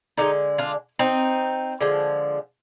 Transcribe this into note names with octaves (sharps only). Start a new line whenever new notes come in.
D3 G#3 C4 D#4
D4 F4
C4 D#4
D3 F3 G#3